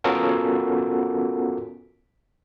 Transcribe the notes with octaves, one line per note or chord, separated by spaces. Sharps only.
B3 C#4 F4 F#4 A4 A#4